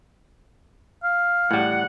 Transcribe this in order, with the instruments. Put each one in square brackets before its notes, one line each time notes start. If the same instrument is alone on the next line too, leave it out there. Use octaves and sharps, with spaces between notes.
[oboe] F5
[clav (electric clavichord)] A2 G3 [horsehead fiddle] F#5